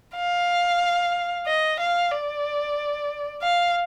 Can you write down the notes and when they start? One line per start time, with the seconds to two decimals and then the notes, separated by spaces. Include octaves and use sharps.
0.17 F5
1.47 D#5
1.80 F5
2.12 D5
3.43 F5